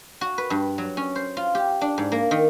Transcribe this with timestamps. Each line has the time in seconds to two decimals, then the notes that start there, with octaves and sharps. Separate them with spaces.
0.21 F#4
0.38 B4
0.50 G2
0.78 F#3
0.97 C#4
1.16 C5
1.37 F4
1.55 G4
1.81 D4
1.98 G#2
2.12 A#3
2.31 D#3